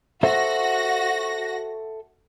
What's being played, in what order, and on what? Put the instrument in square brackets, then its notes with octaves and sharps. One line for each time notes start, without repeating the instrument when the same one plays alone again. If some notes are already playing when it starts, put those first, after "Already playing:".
[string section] F#4 A#6 [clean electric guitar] A4 C5 E5